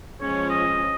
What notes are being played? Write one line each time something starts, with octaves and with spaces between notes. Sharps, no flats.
F3 G#3 C#4 C#5
D#5